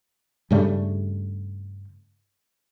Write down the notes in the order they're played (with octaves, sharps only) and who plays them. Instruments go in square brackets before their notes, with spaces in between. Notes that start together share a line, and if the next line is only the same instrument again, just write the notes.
[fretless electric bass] G2 C#3 G3 A3